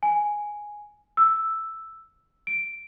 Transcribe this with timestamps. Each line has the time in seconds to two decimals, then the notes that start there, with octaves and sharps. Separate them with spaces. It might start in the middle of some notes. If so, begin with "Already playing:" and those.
0.03 G#5
1.17 E6
2.47 D7